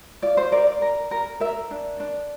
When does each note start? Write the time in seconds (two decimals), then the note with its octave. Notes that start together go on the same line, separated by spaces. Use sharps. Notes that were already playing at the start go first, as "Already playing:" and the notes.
0.22 F4 D5
0.37 C5
0.52 A#4 D5
0.67 D5
0.82 A#4
1.11 A#4
1.40 A#4 E5
1.71 D4
2.00 D4